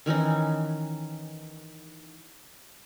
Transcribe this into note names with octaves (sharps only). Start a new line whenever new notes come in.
D#3 E3 C#4 D#4